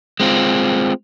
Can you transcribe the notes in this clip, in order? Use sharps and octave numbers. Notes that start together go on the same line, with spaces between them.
G#3 C4 F4